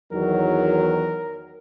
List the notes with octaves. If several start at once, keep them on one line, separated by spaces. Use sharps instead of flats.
E2 D#3 F#3 A#4